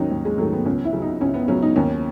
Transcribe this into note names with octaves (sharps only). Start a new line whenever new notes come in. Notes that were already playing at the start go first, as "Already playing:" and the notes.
Already playing: D#2 D#3 F#3 C#4 D#4
D#2
G#3
D#3 F#3 A3
B3
C#2 C#4
E4
C#3 F#3
D#4
C#2 C#4
B3
C#3 F#3 C#4
D#4
D#2 C#4